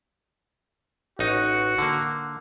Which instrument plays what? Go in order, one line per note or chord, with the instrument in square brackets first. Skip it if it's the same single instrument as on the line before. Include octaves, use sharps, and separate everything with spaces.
[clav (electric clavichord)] A1 D#4 [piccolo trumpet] F#4
[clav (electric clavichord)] D3 A#3